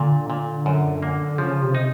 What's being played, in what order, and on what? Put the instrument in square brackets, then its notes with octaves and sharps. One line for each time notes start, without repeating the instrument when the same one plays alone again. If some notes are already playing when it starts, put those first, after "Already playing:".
Already playing: [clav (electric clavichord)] A#2 [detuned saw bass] D3
[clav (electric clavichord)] A#2
F#2
A#3
[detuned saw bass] C#3 [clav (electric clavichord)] F3
[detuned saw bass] C3
[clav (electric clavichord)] D#4